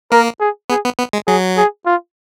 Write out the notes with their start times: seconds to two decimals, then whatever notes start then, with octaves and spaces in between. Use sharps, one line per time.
0.12 A#3 A#4
0.40 G#4
0.70 B3 G#4
0.84 B3
0.99 B3
1.13 G#3
1.27 F#3 G#4
1.57 G#4
1.86 F4